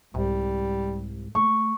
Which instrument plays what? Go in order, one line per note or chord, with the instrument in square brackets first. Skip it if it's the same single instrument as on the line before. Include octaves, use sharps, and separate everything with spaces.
[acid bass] C2 [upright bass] G#2 [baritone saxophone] G3
[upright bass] A3 [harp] C#6